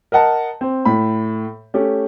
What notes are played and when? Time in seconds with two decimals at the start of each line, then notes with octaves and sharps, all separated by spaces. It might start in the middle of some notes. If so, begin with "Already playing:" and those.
0.12 A#4 D#5 F#5 A5
0.61 C4
0.85 A2 B5
1.74 A3 C#4 G4